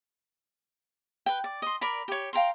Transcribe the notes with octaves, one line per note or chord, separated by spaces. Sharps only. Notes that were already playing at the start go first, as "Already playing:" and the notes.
B4 G5
D5
D#5 C6
A#4 D5 B5
G4 C#5
F5 G5 A#5 C6